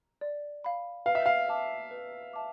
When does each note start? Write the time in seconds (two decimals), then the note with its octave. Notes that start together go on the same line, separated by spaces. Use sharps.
0.21 D5
0.64 F5 B5
1.06 B4 F5
1.15 E5
1.26 F5
1.48 E5 A5 D6
1.91 B4
2.33 E5 A5 D6